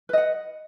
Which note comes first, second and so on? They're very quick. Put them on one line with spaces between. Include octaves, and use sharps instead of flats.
B4 D#5 F#5